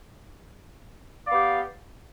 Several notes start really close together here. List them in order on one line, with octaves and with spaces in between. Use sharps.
D5 F5 B3 G4